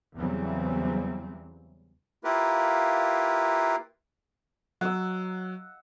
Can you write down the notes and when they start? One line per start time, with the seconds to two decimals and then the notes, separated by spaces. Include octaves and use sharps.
0.16 E2 C#3 E3 F#3 G3 C4
2.24 A#3 E4 F4 G4 A#4 B4
4.81 F#3 F#5 E6